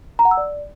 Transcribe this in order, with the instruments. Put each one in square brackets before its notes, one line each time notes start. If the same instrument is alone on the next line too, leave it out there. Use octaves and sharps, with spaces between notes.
[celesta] A#5
F#5
E6
D5